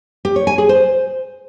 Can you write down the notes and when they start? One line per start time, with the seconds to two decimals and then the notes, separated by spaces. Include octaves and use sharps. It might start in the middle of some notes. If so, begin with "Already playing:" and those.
0.25 G4
0.36 C#5
0.47 G#5
0.58 G#4
0.69 C5